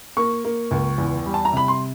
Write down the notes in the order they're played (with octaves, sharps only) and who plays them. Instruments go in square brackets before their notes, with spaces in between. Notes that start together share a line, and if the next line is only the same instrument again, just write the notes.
[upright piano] A#3 C#6
A#3
C#2
E2
G3
A5
A#5
C3 B5
C6